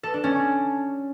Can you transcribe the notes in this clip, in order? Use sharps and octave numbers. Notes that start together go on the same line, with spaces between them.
A4
D4
C#4